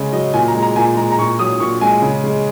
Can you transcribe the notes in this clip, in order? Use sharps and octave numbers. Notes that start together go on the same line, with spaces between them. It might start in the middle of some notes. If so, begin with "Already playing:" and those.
Already playing: C#3 G#3
F#3 D#5
A#2 G#5
A#5
G#3
A#5
A#2 G#5
G#3 A#5
A#5
A#2 C#6
F#3 D#6
A#2 C#6
G#3 G#5
C#3
G#3